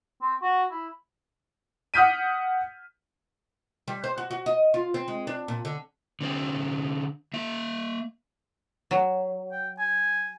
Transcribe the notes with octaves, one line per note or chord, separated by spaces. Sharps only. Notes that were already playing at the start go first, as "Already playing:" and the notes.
C4
F#4
E4
F#5 D#6 F6 G6 B6 D#7
G3
C5
F#4
F#4
D#5
F4
C4
G#3
D4
A#2
D3
D3 C#4 C5
A#3 E5
F#3
G5
G#5